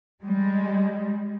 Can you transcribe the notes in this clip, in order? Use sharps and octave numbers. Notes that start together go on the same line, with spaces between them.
G3 G#3